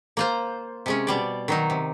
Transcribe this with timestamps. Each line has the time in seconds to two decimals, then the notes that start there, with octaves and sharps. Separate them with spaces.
0.17 A#3 F4 C5
0.86 C3 G#3 C#4
1.07 B2 G3 D5
1.48 D#3 F#3 D#4
1.70 C3